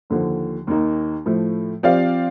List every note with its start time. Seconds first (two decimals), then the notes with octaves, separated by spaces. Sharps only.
0.10 D#2 D3 F3
0.67 D#2 D#3 A#3 D#4
1.25 A2 F3 A3
1.83 F3 C4 G4 D5 F5